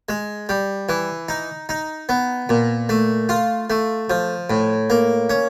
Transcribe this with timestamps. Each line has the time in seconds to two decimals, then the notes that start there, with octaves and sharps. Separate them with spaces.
0.09 G#3
0.49 G3
0.89 E3
1.29 D#4
1.69 D#4
2.09 B3
2.49 A#2
2.89 A3
3.29 F4
3.70 A3
4.10 F3
4.50 A2
4.90 A#3
5.30 C#4